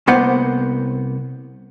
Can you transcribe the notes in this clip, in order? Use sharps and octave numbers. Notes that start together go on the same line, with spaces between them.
C2 A#3 B3 C5 F#5